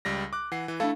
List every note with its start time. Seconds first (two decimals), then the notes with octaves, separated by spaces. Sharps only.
0.05 C#2 G3 A#6
0.33 D6 F#6
0.52 E3 F#5 C7
0.68 E3
0.80 A3 D4 E4 A4 F5